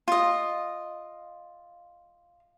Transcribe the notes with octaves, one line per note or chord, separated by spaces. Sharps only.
F4 D#5